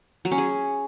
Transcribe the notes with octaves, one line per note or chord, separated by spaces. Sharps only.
F#3
C#4
G#4